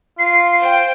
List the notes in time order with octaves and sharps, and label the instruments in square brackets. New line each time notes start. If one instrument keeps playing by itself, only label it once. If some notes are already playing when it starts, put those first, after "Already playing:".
[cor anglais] F4 [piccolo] C7
[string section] C5 G5